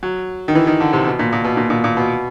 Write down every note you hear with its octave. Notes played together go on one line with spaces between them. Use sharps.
F#3
D#3
E3
D#3
D3
C3
B2
A#2
A#2
B2
A#2
A#2
A#2
B2